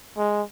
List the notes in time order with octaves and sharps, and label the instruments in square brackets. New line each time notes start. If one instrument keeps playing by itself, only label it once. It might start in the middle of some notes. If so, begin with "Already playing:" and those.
[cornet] G#3